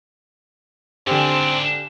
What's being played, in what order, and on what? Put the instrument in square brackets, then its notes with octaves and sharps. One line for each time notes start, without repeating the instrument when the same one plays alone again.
[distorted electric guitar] G#2 D4 [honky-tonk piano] D3 G4 [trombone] C4 [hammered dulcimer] D5 F5 G#5